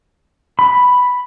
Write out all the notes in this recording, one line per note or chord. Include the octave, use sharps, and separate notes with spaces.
B5